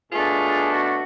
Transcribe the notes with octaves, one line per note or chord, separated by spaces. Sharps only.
B2 A3 D4 F4 G#4
F#4